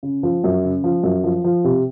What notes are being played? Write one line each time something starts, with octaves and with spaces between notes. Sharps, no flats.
C#3
F3
F#2
C#3
F3
F#2
F3
F3
C3